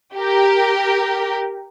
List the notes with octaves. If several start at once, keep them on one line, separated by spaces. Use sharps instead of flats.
G4 A#4